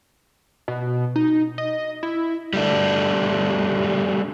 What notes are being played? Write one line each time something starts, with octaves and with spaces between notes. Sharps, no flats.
B2
D#4
D#5
E4
G3 A3 D4